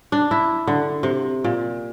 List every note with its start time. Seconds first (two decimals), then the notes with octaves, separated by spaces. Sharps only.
0.12 D4
0.31 E4
0.67 D3
1.03 C3
1.44 A#2